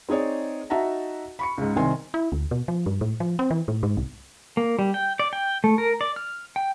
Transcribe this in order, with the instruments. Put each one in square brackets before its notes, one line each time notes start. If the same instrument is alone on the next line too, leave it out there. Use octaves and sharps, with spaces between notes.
[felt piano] C4 D#4 G#4 C#5 D5
D#4 F#4 E5 F#5 A5 A#5
B5 C#6 C#7
C#2 G#2
C2 D#3 C4 G#5 C6
[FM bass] E4
D2
B2
F3
G2
A2
F3
C4
E3
A2
G#2
C2
[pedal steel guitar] A#3
G3
G5
D5
G5
A3
A#4
D5
F6
G5